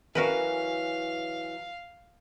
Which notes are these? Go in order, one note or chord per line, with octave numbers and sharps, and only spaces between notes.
E3 F#3 C#4 F#4 A#4 B4 F5